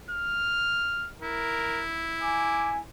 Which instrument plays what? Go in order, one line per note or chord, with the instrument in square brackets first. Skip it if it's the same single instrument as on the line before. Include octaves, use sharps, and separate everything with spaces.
[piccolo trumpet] F6
[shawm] E4 [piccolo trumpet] A#4
[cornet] G#5 [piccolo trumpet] D6